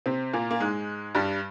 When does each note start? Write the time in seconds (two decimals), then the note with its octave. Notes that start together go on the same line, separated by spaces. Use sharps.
0.06 C3 C4
0.33 A#2 A#3
0.51 A#3
0.60 G#2 G#3
1.15 G2 G3